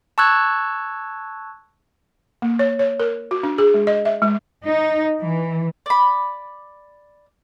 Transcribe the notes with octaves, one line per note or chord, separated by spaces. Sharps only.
A5 C#6 E6 F#6 G#6
A#3
C#5
C#5
A#4
F#4
D4
G#4
G#3
D#5
E5
G#3
D#4
E3
D5 B5